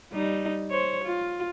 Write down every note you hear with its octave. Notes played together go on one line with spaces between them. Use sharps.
G3 D#4
C5 C#5
F4